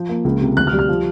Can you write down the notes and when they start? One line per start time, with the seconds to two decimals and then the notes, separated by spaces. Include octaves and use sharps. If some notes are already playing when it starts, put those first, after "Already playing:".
Already playing: F3 G6
0.09 A#3
0.24 C#2
0.41 C3
0.57 D2 F#6
0.67 F6
0.73 G3
0.79 F6
0.89 F3